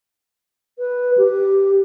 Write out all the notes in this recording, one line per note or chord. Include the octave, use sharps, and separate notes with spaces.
B4
G4